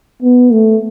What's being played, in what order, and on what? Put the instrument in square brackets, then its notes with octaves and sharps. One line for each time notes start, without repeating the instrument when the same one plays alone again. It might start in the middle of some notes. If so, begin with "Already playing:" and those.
[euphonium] B3
A3